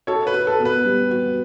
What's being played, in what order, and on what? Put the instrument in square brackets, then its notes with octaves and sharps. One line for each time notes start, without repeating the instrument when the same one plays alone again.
[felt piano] F#4 [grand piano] A4 C#5
[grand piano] B4
[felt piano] F#4
[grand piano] A4
[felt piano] B3
[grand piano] B4
[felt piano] G3
F#4